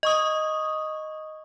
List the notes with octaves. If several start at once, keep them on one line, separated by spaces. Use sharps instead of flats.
D#5 C#6 D#6